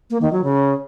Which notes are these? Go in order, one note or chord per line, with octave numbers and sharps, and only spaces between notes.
A#3
D#3
F#3
C#3